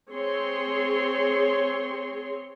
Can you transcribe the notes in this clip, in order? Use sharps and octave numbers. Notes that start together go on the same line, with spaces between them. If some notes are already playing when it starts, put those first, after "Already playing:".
C4 G#4 C#5 C6